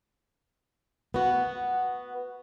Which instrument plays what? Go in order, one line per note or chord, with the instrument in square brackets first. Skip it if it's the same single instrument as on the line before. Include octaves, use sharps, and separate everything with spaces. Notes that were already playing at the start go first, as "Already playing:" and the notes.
[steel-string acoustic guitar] B3 F#4